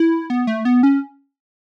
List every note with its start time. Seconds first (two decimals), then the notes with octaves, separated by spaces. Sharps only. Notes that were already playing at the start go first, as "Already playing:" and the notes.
Already playing: E4
0.30 B3
0.47 A3
0.65 B3
0.83 C#4